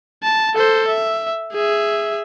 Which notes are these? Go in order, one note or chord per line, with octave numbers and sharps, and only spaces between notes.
A5
A4 C5
E5
G#4 E5